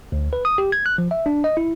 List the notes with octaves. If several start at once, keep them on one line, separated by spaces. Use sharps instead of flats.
D2
B4
D#6
G4
G#6
F#6
F3
E5
D4
D#5
E4